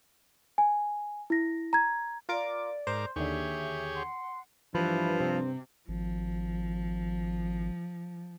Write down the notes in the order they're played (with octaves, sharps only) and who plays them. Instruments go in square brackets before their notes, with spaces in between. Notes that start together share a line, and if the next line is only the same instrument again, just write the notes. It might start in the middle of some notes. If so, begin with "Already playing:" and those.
[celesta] G#5
E4 A#6
A#5 G#6
[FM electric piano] F4 A#4 D6 [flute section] D5
[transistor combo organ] G#2 A#4 D6 [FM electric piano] C5
[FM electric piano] D#2 D3 [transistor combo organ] G4 G#4 C#5 [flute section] E5
[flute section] F#5 C6
[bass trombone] G2 [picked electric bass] E3 [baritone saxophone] F3 [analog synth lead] B4
[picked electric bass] C3 [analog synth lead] C4
[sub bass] G#1 [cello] F3